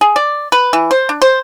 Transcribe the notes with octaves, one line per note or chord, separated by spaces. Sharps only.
G#4
D5
B4
E3
C5
D4
C5